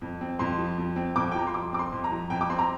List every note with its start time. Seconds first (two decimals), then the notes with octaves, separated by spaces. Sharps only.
0.02 F2
0.21 C4
0.39 F2 C6
0.58 F3
0.78 F2
0.96 C4
1.16 F2 D6
1.32 G5
1.35 F3 A#5
1.47 C6
1.54 F2 D6
1.73 C4 D6
1.79 C6
1.92 F2
2.04 A#5
2.12 F3
2.30 F2 G5
2.41 D6
2.50 C4 C6
2.59 A#5